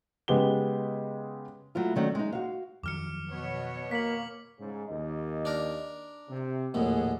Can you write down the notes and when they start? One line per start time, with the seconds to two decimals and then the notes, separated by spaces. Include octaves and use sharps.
0.28 C#3 G#3 B3 G4 G7
1.75 F#3 A3 E4 F4
1.96 D#3 F#3 A3 C#4 D4
2.15 G#3 D#4
2.33 F#4 F5
2.84 F2 D#3 F#3 D6 F6 C#7
3.29 B2 B3 C#5
3.91 A#3 B6 F#7
4.59 G#2 C#3
4.89 D#2 D#5
5.45 D4 A#4
6.29 C3
6.74 A#1 D#2 A2 A3 G#4 F#5